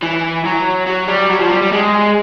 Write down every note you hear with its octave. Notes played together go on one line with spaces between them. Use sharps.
E3
F#3
F#3
G3
F#3
F3
G3
G3
G#3